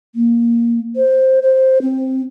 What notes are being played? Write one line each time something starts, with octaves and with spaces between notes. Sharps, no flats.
A#3
C5
C5
C4